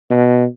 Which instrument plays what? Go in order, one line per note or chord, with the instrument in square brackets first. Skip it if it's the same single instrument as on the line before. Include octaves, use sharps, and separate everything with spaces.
[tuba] B2